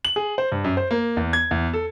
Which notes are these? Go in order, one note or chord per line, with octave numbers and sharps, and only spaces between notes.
F#7
G#4
C5
G2
F#2
C5
A#3
E2
G#6
E2
A4